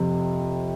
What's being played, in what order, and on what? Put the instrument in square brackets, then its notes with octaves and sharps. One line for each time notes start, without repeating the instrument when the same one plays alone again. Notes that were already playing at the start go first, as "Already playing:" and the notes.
Already playing: [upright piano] F2 C3